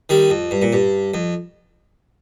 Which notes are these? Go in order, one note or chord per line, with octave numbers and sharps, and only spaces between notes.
D#3 G3
F2
G2
A#2
G2
F2